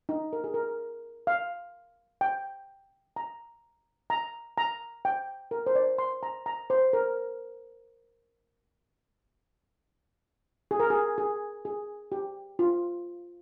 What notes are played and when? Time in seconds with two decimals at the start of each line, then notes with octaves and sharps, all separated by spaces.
0.09 D#4
0.33 A#4
0.44 G#4
0.54 A#4
1.27 F5
2.21 G5
3.16 A#5
4.10 A#5
4.58 A#5
5.05 G5
5.51 A#4
5.67 C5
5.75 D5
5.99 C6
6.23 A#5
6.46 A#5
6.70 C5
6.93 A#4
10.71 G#4
10.80 A#4
10.90 G#4
11.18 G#4
11.65 G#4
12.12 G4
12.59 F4